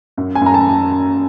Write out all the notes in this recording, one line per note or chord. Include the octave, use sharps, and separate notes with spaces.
F#2
G#5
F#2 A#5
A5